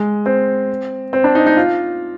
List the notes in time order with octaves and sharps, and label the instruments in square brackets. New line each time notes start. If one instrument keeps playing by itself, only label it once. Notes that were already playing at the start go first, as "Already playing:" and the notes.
Already playing: [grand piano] G#3
C4
C4
D4
D#4
D#4
F4